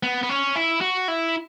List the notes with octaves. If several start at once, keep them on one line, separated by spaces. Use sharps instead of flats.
B3
B3
C#4
E4
F#4
E4